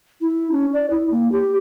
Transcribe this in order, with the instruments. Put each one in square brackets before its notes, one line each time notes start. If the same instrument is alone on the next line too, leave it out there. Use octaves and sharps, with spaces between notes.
[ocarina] E4
C#4
D5
E4
A#3
G4